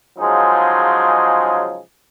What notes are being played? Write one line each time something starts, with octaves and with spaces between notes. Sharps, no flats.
C#3 F3 F#3 G#3 D#4 G#4